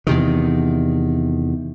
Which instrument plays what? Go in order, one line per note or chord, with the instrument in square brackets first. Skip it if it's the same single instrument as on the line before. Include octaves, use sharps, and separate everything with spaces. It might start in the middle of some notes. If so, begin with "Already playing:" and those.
[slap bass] E2 C3 D#3